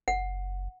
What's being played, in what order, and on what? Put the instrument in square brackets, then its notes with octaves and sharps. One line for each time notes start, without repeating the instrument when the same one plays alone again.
[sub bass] F#1 [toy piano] F#5